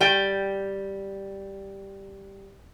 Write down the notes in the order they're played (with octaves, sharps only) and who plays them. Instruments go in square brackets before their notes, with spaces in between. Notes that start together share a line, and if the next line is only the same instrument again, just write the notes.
[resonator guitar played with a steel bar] G3 G5